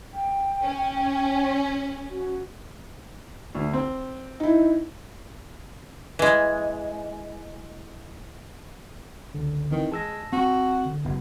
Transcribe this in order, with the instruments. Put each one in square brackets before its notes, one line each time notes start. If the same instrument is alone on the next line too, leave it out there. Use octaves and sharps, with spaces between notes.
[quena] G5
[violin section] C#4
[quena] F#4
[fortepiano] D2
C4 C5
[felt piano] D#4 E4
[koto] E3 G#3
[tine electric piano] C#2 D3
[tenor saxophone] D#3 [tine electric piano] E3 C4 G5
[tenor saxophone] G#3 [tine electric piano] A5 E6 A#6
[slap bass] C4 [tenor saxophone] F#4
[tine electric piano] D3
[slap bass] F#1 [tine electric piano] B3